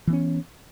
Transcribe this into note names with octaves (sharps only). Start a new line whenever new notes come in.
E3 B3 C#4